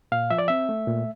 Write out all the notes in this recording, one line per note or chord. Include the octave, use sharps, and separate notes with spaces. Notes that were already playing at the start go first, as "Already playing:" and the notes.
A#2 F5
F3 E5
D5
C4 E5
A3
A#2